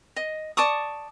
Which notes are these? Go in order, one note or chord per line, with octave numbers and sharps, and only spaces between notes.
D#5
D5 A5 C#6 D#6